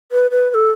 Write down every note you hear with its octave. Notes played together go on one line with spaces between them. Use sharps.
B4
B4
B4
A4